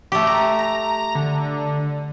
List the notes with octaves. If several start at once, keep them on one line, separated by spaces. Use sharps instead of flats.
A3 G4
A#5
A#5
D3